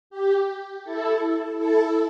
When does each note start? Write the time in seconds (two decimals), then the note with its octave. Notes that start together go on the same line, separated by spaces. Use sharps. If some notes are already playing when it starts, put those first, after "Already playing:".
0.10 G4
0.84 E4 A4
1.58 E4 A4